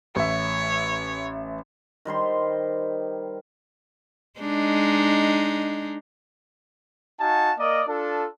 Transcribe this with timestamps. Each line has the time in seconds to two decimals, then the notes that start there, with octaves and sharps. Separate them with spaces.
0.16 A1 C#5 E5
2.05 D#3 G3 C5 C6
4.40 G#3 D4 D#4
7.19 D#4 F#4 F5 G#5 A5
7.57 A#3 A#4 D5 D#5
7.87 D4 F4 A4